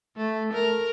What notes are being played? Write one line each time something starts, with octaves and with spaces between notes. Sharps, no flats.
A3
A#4